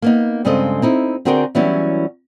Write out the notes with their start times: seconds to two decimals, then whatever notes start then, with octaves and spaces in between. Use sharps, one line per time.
0.02 A#3 B3 D#4
0.45 G2 C#3 G#3 C4 A4 D#5
0.82 C4 D#4 E4
1.25 D3 C4 F#4 G#4 A#4 G5
1.55 E3 F#3 G3 B3 C#4 E4